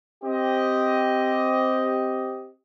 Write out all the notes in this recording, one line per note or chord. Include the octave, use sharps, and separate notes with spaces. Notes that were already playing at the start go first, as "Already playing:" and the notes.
C4 G4 D#5